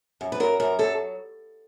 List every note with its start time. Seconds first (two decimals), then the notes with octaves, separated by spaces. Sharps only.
0.21 F#2
0.32 B4
0.40 F#3 A#4
0.60 F#2 A#4
0.79 F#3 A4